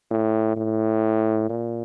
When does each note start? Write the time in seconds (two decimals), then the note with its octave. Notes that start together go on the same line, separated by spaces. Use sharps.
0.11 A2
0.57 A2
1.49 A#2